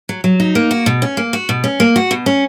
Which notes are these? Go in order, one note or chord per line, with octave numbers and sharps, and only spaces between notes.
F#3
F#3
D#4
A#3
F#4
B2
C#4
A#3
F#4
B2
C#4
A#3
F#4
B2
C#4